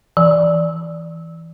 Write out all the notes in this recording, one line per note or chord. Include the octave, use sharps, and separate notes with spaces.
E3